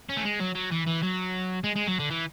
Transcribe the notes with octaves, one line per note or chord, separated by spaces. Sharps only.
C#4
A3
G#3
F#3
F#3
E3
E3
F#3
G#3
G#3
F#3
D3
E3